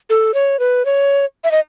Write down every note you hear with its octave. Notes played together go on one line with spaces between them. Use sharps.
A4
C#5
B4
C#5
E5
D#5